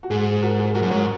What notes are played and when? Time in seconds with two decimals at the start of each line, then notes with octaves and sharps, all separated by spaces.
0.03 F#4
0.10 G#2 G#4
0.42 F#4 A#4
0.58 G#4
0.74 G#2 F#4 A#4
0.82 F#2
0.90 G#2 A#4 C#5